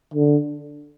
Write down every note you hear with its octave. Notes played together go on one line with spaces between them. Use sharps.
D3